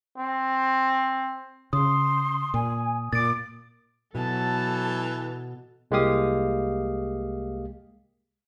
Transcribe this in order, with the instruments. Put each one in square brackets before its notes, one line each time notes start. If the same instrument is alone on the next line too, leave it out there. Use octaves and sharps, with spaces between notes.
[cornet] C4
[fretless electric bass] C#3 [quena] C6 [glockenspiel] D#6
[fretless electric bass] A#2 [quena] G#5
[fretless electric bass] A#2 [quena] D6 [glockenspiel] A6 D7
[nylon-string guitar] B2 [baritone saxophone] E3 [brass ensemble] F#3 [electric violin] A4 A5
[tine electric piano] C2 G#3 A#3 G4 F5 D#6